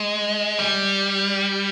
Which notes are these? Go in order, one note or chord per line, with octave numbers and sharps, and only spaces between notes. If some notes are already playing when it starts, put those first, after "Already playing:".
Already playing: G#3
G3